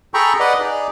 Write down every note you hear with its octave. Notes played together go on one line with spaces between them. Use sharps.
G#4 A4 G5 A#5 B5 C#6
B4 D5 D#5 F#5
D#4 G#4 D5